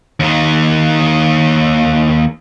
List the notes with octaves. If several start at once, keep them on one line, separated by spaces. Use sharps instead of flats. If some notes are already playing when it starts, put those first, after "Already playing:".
D#2 D#3